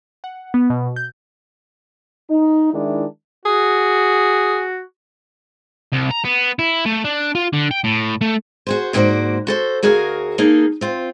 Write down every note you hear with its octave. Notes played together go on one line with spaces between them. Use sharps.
F#5
B3
B2
G6
D#4
D#3 G#3 D4 E4
F#4 G#4
C2
A#5
B3
E4
A3
D4
F4
D3
G5
A2
A3
F#4 G#4 C5
D2 G#2 A#3 F#4 C5 D5
F#4 A4 C5
D2 F#4 G#4 A#4 F5 G#5
A#3 D#4 G#4 A4
C4 F4